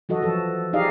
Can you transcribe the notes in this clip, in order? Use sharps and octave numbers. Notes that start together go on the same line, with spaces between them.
E3 F#3 F#4 A4 D#5
F3 A4
D#4 G4 G#4 D5 D#5 F5